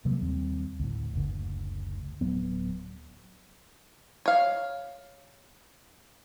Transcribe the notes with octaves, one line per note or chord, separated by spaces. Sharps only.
C3 F#3 G3 A#3
D#2 G3 C4
D2 A2
F#1 D2
D1 F#3 B3
C#5 F5